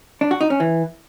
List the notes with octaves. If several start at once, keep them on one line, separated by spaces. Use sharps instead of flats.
D4
F#4
D#4
C#4
E3